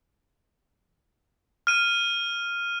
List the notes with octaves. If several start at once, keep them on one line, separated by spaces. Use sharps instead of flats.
F6 D#7